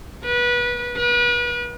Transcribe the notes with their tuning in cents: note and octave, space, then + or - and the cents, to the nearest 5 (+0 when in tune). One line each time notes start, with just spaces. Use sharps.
B4 -25
B4 -40